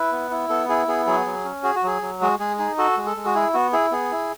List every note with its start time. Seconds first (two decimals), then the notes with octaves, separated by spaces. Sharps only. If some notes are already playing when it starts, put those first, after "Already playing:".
Already playing: E4 B4
0.12 B3
0.31 E4
0.49 B3 A4
0.69 E4 G#4
0.88 B3 G#4
1.07 F#3 G#4
1.26 F#3
1.44 C#4
1.63 F#4 G#4
1.76 F#4
1.83 F#3 G#4
2.02 F#3
2.21 G#3 F#4
2.39 G#3 G#4
2.58 D#4 G#4
2.78 F#4 A4
2.97 G#3
3.06 A4
3.17 G#3
3.25 F#4
3.35 E4 G#4
3.54 B3 F#4
3.73 E4 G#4
3.92 B3 G#4
4.12 E4